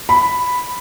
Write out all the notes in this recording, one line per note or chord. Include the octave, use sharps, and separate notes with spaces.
B5